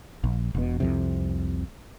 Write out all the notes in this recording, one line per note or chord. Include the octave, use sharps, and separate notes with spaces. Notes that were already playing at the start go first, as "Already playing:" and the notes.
A#1
E1 B2
C2 F2 C3